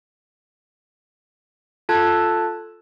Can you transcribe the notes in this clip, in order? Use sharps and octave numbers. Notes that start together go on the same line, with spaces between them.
F4 A4 A5 F#6 G#6